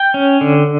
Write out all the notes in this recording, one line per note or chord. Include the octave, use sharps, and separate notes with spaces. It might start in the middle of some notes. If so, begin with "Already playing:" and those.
Already playing: G5
C#4
D3